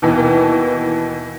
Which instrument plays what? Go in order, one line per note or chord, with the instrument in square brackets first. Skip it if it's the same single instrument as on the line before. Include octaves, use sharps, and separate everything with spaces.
[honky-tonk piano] D#2 B2 E3